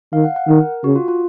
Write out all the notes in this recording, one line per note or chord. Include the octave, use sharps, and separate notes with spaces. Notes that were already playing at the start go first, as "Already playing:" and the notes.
D#3 F5
F#5
F#5
D#3 A#4
C#3 F#4
F4
F4